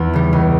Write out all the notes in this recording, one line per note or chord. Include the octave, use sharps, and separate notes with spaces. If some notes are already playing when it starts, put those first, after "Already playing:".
Already playing: E2
C#3 G3
C#2